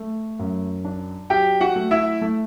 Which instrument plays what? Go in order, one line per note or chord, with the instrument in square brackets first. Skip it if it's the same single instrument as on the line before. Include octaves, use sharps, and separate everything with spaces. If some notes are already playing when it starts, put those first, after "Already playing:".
Already playing: [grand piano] A3
F#2
D4
F#3 G4 G5
F#4 F#5
A3
E4 E5
A3